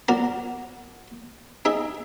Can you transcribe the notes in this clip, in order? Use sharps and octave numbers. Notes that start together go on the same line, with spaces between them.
F#4 A#4 D5
D#4 G#4 E5